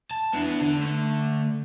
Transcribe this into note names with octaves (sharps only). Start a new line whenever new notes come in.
A5
B3 D4 E4
D3
A3